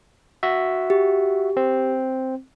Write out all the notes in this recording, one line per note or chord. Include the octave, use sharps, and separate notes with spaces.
F#4 E5
G4
C4